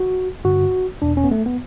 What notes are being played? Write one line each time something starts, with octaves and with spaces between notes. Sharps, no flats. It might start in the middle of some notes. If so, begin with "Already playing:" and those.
Already playing: F#4
G2 D3 F#4
E2 B2 D4
C#4
B3
A3
B3